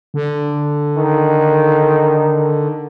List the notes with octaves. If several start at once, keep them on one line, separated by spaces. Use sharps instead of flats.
D3
D#3